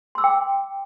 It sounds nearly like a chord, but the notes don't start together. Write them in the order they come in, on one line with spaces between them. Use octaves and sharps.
C6 E6 D6 G5